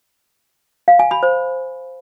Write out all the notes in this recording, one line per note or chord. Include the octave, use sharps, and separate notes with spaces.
F5
G#5
B5
C5